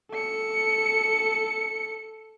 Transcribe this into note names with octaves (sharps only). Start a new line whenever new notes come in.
A4 C#7